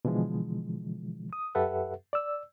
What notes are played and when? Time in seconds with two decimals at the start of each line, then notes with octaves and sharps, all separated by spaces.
0.05 B2 D3 E3 F3 G#3
1.33 D#6
1.55 F#2 G4 A4 B4 E5 F#5
2.13 D5 E6